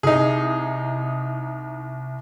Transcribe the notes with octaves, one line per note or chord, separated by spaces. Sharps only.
C2 D#4 G#4